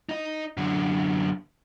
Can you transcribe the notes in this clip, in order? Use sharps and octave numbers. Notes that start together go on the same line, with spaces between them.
D#4 D#5
F#2 D3